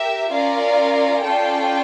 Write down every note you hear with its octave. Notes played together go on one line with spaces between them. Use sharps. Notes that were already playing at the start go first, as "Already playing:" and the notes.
Already playing: G4 A#4 E5
C#4 F4 A#4 D5 F5
C#4 F4 A4 D5 G5